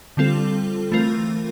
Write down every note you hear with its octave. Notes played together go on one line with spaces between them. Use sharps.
D3 G3 C4 F4 A4
E3 A3 C4 F4 A#4